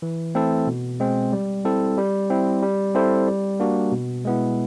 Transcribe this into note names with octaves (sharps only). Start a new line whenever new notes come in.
E3
A3 C4 E4 A4
B2
G#3 C4
G3
C4 E4 A4
G3
C4 E4
G3
C4 E4 A4 C5
G3
A#3 D4 F#4
B2
G#3 B3 E4